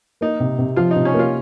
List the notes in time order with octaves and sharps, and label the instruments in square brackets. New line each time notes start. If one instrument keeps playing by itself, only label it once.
[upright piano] A#3 [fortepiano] D#4
[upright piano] C3
C3
[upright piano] F3 [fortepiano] F4
[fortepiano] D#4
[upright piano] C3
[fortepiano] C#4
[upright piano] A#3 [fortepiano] F4